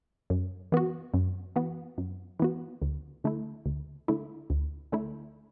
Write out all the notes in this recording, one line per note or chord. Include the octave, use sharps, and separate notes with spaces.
F#2
E3 B3 F#4
F#2
E3 B3 F#4
F#2
E3 B3 F#4
D2
D3 A3 E4
D2
D3 A3 E4
D2
D3 A3 E4